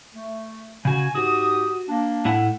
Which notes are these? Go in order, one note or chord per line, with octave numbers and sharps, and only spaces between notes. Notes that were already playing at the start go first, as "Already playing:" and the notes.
A3
C#3 F#4 G#5
G#2 F#4 G4 D#6
A#3 D4
A2 E4 F#5